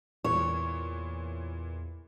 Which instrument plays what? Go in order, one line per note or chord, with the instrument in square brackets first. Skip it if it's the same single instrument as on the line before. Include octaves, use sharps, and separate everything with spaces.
[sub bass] E2 [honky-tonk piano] A#2 E3 [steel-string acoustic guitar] C#5